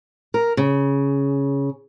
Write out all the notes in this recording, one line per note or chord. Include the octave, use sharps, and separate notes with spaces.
A#4
C#3